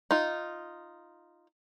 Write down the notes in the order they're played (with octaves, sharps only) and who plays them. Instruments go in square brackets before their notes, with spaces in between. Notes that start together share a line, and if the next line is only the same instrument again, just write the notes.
[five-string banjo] D#4 F4